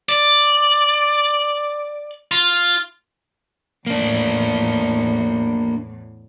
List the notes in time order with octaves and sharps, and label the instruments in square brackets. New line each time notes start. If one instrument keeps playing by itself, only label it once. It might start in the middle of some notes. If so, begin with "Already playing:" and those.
[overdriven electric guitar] D5
F4
[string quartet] E2 A2 [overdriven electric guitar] A#3 D4